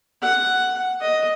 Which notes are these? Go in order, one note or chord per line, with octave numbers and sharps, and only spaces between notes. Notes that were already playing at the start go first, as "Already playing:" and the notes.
F#5
D#5